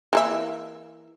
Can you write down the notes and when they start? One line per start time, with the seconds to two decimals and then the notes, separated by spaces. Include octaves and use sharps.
0.13 E3 A#3 E5